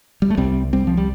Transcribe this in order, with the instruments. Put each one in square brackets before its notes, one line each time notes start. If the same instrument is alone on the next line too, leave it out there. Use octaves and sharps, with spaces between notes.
[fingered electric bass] G3
A3
C2 C3 G3 C4
G3 C4
F3
G3